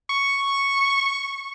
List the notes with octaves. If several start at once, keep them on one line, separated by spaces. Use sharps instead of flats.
C#6